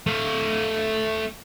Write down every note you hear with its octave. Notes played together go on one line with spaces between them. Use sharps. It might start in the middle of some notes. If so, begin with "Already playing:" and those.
A3 F5